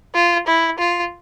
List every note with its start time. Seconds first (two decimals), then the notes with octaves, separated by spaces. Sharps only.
0.15 F4
0.47 E4
0.79 F4